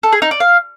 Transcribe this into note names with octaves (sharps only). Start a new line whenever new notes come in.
A4
G#4
D#4
D5
F5